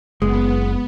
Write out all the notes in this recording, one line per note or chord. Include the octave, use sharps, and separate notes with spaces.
F#1 G#3 B3